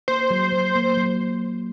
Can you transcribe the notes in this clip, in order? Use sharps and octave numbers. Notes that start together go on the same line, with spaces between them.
A#3 C5
F#3
F#3
A#3
F#3